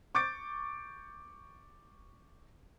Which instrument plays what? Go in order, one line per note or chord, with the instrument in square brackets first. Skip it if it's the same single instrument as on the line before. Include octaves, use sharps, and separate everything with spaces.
[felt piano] C#6 D6 G6 A6 D7